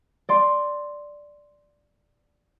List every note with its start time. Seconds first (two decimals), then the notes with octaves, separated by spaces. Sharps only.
0.29 D5 C6